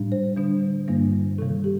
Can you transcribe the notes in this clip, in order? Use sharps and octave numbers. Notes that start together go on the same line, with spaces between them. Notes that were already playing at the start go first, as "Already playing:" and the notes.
Already playing: A2 G3 D4
C5
D3 G3 D4
G2 D3 G3 A#3 D4
C3 D#3 G3 A4
G4